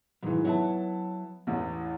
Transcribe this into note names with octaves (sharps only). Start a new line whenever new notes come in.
G#2 B2 D#3 E3 F#3
F#3 B3 E4 C#5 F#5 A5
A1 E2 A3